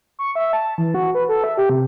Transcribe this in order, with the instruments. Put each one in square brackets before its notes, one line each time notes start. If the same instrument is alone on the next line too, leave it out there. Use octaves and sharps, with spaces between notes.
[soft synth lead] C#6
E5
A5
E3
F#4
B4
A4
E5
G4
C3